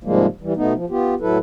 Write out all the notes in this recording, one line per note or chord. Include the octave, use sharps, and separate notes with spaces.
G#2 C3 F3 G3 G#3 A#3
E3 G3
B2 A3 B3 D#4
F3
B3 F4 G4
A2 F#3 E4 A4 B4